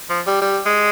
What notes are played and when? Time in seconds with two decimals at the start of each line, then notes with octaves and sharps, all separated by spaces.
0.10 F3
0.27 G3
0.42 G3
0.66 G#3